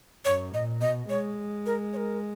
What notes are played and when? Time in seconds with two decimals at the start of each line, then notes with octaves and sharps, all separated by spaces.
0.25 F#2 C#5
0.53 A#2 D#5
0.81 B2 D#5
1.09 G#3 C#5
1.66 A#4
1.93 C#5
1.97 A#4